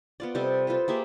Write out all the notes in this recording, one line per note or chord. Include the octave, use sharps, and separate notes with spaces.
B3 F4 D5
C3 G3 A4 D#5
F4 A4 B4 C5
A#3 G4 G#4 E5